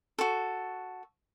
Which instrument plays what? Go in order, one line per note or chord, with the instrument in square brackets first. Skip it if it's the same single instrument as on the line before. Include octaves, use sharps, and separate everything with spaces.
[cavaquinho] F#4 A4